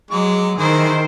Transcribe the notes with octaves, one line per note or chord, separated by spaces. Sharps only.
F#3 G#3 D6
D#3 E3 G#4 C5 D#5